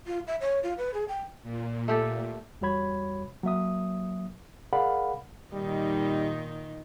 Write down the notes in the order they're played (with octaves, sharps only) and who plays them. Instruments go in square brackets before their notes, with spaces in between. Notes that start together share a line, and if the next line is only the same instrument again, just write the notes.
[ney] F4
E5
C#5
F4
B4
G#4
G5
[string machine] A#2
[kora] A3 G4 A4
[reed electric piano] E2 G3 F#4 C#5 B5 G#6
F#3 A#3 E5 D#6
G#4 A#4 D5 F5 F#5 B5
[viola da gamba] A#2 D#3 D#4 [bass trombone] G3